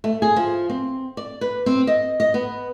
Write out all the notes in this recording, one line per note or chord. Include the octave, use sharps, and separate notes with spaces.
A3
G#4
F3
C4
D5
B4
C4
D#5
D#5
B3